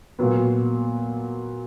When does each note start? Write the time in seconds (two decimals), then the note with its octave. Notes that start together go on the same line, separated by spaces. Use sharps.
0.19 A#2 F#3 B3